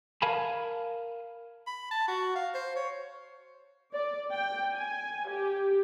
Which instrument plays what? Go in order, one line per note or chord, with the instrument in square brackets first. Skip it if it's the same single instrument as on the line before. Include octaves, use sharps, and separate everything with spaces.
[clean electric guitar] A#4 F5 G#5 A5 B5
[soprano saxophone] B5
A5
F#4
F5
C5
C#5
[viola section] D5
G5
G#5
G4